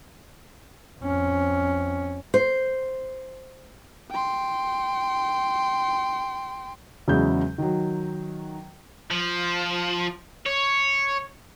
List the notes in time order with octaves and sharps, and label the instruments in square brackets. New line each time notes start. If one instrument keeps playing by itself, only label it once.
[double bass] F2 C#4
[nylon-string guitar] C5
[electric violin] G5 C6
[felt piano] E2 C#3 F#3 G#3 E4 G6
D#3 F#3
[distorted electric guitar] F3
C#5